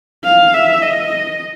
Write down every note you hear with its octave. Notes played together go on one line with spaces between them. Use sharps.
F5
E5
D#5